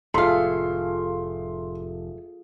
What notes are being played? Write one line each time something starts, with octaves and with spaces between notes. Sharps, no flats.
F1 A2 A3 F4 G#4 A4 F5 C6